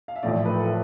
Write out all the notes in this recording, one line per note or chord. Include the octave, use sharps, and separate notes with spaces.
F5
E5
A1 A2 F3 D5
B4
A4